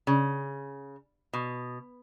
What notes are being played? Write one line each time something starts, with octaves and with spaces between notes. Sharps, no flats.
C#3
B2